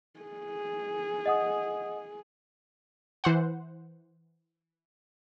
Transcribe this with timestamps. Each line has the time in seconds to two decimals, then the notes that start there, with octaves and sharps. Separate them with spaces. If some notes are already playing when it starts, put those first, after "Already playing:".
0.20 G#4
1.26 D#5 F#5 D#6
3.24 E3 C5 F#5